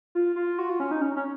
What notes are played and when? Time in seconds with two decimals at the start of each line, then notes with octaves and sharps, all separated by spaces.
0.15 F4
0.36 F4
0.58 F#4
0.69 F4
0.80 C#4
0.91 D#4
1.02 C#4
1.16 C#4